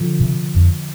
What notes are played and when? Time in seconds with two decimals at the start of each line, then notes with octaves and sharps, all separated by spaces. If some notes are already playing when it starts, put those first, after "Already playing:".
Already playing: D3 F3
0.20 C3
0.55 F2